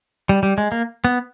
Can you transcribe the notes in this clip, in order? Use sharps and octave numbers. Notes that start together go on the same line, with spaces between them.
G3
G3
G#3
A#3
B3